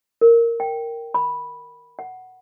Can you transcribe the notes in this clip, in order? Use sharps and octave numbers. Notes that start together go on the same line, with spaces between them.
A#4
G5
B5
F#5